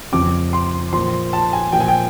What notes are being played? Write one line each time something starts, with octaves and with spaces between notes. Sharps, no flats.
F2 C#3 F3 D6
C6
A#2 F3 C6
A5
G#5
A#2 F3 G5
G#5
G5